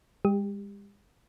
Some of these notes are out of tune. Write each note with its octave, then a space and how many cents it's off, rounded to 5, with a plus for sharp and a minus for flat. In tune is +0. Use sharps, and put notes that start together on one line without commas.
G#3 -45 G4 +20